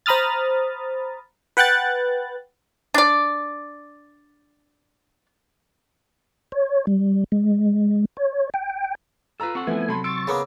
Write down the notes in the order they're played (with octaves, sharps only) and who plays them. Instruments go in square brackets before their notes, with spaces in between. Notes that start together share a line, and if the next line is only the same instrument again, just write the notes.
[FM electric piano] C5 A#5 B5 D#6 F6 A6
B4 F#5 G5 F#6 A6
[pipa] D4 D5
[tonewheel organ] C#5
G3
G#3
C#5
G5
[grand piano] F4 A#5 E6 [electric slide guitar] A4 B4
[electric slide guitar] C4 A4 F#5 [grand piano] C#6
[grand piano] F3 B3 E4 [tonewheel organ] A3 G#5
[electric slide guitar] C3 F#3 C4 [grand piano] A4 B5 C6
[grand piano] C6 E6 D7 [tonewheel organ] C#6 A6
[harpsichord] C#3 A#3 B3